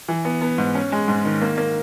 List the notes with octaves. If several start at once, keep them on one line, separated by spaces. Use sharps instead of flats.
E3
B3
B3
G#2
C#4
G#3
G#2
D#3
A#3
A#3